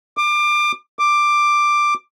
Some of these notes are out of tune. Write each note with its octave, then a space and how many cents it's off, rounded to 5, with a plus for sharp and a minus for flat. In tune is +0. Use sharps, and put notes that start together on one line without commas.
D6 +25
D6 +10